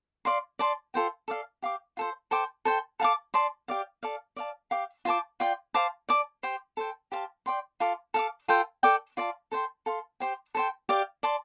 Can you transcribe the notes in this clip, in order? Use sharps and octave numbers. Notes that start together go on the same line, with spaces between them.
D5 F5 C6
D5 A5 C6
F4 A4 C5 G5
A4 D5 F5
G4 F5 D6
F4 A4 C5
A4 C5 G5 D6
A4 C5 G5
A4 F5 A5 D6
D5 A5 C6
G4 D5 F5
A4 D5 F5
D5 F5 A5
G4 F5 D6
F4 C5 A5 D6
F4 D5 G5
C5 F5 A5 D6
D5 A5 D6
G4 C5 G5
A4 C5 G5
G4 C5 F5 A5
D5 G5 C6
F4 A4 F5 D6
A4 F5 D6
F4 A4 C5 G5
A4 D5 G5 D6
F4 D5 F5 A5
A4 C5 G5 C6
A4 F5 C6
G4 C5 G5
A4 C5 G5
G4 D5 F5
D5 A5 C6